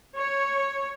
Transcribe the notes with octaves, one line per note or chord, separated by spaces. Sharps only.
C#5